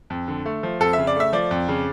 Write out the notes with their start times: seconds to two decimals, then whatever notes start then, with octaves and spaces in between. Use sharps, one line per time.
0.10 F2
0.28 D3
0.46 A3
0.63 F3
0.80 F2 A4
0.93 C#3 E5
1.07 D5
1.16 A3 E5
1.33 F3 D5
1.51 F2
1.68 C#3